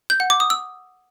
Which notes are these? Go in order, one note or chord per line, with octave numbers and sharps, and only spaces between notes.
G6
F#5
D6
D#6
E6